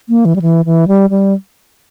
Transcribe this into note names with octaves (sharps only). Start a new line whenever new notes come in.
A#3
E3
G3
E3
E3
G3
G3